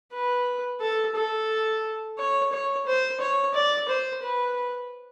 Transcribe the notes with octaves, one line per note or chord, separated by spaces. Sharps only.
B4
A4
A4
C#5
C#5
C5
C#5
D5
C5
B4